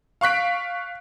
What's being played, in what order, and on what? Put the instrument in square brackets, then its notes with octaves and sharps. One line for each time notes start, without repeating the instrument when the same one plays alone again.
[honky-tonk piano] F5 C#6 F#6 B6 D7